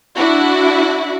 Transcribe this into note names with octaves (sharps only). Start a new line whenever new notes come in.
D4 E4 F#4